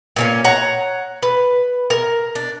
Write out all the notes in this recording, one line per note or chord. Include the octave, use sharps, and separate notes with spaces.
A#2 A#3 C#4
C#5 F#5 A#5
B4
A#4
D4